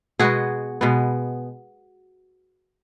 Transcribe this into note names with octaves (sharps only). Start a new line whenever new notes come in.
B2 G#3 B3 F#4 G#4
B2 G#3 B3